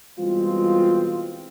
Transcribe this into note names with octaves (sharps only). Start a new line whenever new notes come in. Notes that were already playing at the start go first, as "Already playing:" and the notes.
B2 E3 G3 G#3 C4 F4